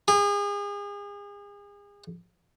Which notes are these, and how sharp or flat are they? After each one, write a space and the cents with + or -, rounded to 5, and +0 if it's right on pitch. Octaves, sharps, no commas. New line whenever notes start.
G#4 -35